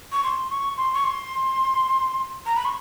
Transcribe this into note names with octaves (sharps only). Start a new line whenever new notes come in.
C#6
C6
C#6
C6
C#6
C6
A#5
B5
C#6